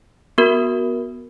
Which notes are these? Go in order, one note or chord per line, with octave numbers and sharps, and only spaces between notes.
B3 F#4 A#4